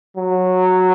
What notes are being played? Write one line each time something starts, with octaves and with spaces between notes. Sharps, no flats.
F#3